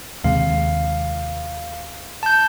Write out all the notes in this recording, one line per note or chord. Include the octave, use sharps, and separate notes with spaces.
D#2 C3 G#3 F5
A5 G6